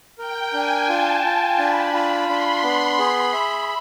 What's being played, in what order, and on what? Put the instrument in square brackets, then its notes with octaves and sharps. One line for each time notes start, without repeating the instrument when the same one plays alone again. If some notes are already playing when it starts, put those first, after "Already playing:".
[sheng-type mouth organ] A#4 [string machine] G5
[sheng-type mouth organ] D4 [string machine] G#5
[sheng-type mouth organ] F4 [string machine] A5
[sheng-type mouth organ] F4
[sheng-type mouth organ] D4 [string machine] B5
[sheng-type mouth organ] F4
[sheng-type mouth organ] D4 [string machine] C6
[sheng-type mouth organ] B3
[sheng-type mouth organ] G#4 [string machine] B5
[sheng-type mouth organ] E5